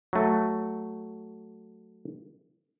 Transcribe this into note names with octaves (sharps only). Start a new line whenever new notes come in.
F#3 A3